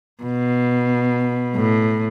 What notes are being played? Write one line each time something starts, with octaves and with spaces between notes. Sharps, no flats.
B2
A2